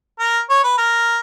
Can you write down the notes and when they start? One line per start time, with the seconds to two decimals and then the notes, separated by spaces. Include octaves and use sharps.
0.19 A#4
0.49 C#5
0.64 B4
0.78 A#4